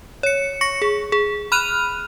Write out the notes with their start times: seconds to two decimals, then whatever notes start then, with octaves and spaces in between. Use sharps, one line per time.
0.23 C#5 C#7
0.61 C#6 A#6 C#7
0.82 G#4
1.12 G#4
1.52 B5 F6 F#6 D#7 F7